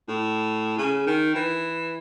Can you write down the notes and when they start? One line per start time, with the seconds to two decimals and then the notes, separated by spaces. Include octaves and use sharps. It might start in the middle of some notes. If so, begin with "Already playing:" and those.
0.08 A2
0.78 C#3
1.07 D#3
1.35 E3